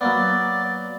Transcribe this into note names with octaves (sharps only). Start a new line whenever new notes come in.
F#3 A#3 B3 D5